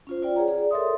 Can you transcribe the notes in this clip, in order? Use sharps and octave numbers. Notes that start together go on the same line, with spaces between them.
C#4 F4 C5
F4 D5 G5
G#4 C#5 D5 F#5 A#5
G#4 D5
A4 A#4 C#5 E5 C6 D#6